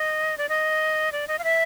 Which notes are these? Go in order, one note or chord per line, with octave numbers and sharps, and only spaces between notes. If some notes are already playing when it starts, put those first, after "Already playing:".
Already playing: D#5
D5
D#5
D5
D#5
F5
E5